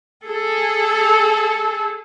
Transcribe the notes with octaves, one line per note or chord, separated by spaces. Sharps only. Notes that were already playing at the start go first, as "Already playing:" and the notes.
G#4 A4